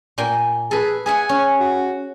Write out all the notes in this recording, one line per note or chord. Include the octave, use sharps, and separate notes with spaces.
A#2 G5 G#5
G#4 A4 B4
G#4 E5 F#5 G#5
C#4
F#4